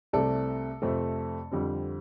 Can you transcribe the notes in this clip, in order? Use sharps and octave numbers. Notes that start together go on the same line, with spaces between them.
C2 C3 A3 A4 D5
F2 C3 A3 C4
F2 D3 G3 C4